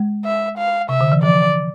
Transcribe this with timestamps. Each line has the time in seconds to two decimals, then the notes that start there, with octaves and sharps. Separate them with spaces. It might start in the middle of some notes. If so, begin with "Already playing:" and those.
Already playing: G#3
0.25 E5
0.58 F5
0.89 C3 E5
1.01 D3
1.12 E3
1.23 F3 D5